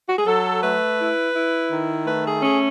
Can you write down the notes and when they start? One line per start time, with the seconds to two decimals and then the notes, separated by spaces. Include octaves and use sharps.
0.08 F#4
0.18 G#4
0.27 F#3 A4
0.63 A3 B4
0.99 E4
1.35 E4
1.71 D#3
2.07 A3 B4
2.25 G#4
2.43 C#4 G#4